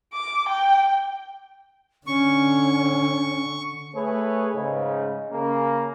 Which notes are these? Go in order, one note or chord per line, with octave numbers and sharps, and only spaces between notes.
D6
G5
D3 C#4 C#6
A3 G#4 B4 C#5
G#2 C#3
C#3 A#3